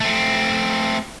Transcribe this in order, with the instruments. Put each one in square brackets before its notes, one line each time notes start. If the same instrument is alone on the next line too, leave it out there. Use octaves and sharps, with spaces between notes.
[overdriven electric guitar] A3 C4